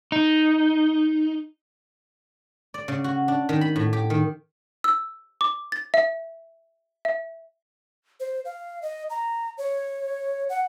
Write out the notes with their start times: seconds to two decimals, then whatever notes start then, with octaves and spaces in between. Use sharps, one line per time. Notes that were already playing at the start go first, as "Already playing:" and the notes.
0.12 D#4
2.74 D5
2.88 C#3
3.04 F#4
3.28 D4
3.49 D#3
3.61 B5
3.76 A2
3.93 G4
4.10 D#3
4.84 E6
5.41 D6
5.72 A6
5.94 E5
7.05 E5
8.20 C5
8.45 F5
8.82 D#5
9.10 A#5
9.58 C#5
10.49 F#5